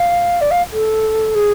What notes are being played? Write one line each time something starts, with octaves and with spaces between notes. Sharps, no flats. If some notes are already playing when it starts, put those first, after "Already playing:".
Already playing: F5
D5
F5
A4
G#4